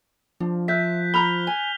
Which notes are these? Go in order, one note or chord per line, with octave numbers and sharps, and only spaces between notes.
F3 D4
E5 F#6 G6 B6
A#5 B5 F6 F7 G7
G#5